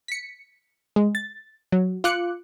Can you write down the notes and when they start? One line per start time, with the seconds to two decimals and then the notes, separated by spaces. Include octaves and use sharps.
0.08 B6 C#7
0.96 G#3
1.15 A6
1.72 F#3
2.04 F4 D6 F#6 C#7